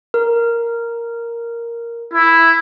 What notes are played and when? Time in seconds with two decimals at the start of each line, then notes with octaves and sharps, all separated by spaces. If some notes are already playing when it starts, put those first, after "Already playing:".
0.14 A#4
2.13 E4